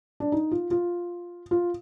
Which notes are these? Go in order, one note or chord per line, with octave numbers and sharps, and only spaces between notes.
D4
D#4
F4
F4
F4